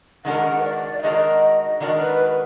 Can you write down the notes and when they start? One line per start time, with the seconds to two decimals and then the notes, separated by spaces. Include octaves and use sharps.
0.25 D#3 G#3 D4 F#4 A#4 F#5
0.60 B4
0.64 D5
0.99 F5
1.03 D#3 G#3 D4 F#4 A#4 D#5
1.80 D#3 G#3 D4 F#4 A#4 D5
2.01 B4